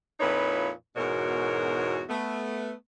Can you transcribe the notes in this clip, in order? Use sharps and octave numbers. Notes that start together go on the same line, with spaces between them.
F2 A#2 D#4 E4 B4 C#5
E2 G#2 B2 F#4 A#4 C#5
A3 B3